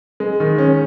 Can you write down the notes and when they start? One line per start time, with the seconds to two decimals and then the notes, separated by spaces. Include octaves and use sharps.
0.20 G#3
0.40 D#3
0.58 C#4